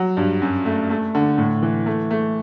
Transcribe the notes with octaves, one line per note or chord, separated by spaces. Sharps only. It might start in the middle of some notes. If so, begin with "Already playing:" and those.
Already playing: F#3
G2
F#2
A3
A3
D3
A2
E3
A3
A3